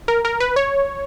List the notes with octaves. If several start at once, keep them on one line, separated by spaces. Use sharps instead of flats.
A#4
A#4
B4
C#5